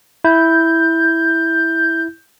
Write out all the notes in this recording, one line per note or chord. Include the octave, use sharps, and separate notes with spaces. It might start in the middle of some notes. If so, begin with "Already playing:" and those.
E4 G6